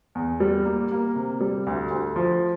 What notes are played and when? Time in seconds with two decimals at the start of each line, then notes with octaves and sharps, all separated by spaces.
0.15 E2
0.40 G3
0.65 A#3
0.91 A#3
1.16 C3
1.41 G3
1.67 D2
1.91 D2
2.16 F3